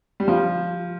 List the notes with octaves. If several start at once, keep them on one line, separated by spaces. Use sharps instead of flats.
G3
F3